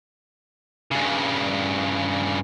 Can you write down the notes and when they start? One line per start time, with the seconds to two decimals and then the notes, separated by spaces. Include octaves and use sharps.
0.91 G2 C#3